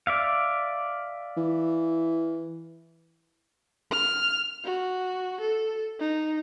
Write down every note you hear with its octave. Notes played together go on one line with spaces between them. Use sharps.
D5 E5 F5
E3
F6
F#4
A4
D#4